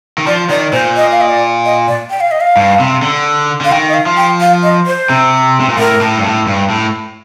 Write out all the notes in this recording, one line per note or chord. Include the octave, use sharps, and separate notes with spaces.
D#3
F3 D5
D#3 D5
A#2 C5
D#5
F5
D#5
D5
D#5
D5
G5
F5
D#5
F5
G2
C3
D3
D3 F5
D#3 G5
D#5
F5
F3
G5
F5
D#5
C5
C3
C3
A#2
A2 A#4
A2
G2
A2
G2
A2